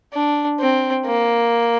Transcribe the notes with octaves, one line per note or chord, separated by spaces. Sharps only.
D4
C4
A#3